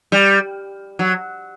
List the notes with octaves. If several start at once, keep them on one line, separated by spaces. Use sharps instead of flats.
G3
F#3